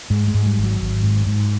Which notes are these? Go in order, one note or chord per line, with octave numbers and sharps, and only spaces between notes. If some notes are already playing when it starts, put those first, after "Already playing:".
G#2 G#3
G#3
G#2
G3
G#1
F#3
G#1
G#2
G#2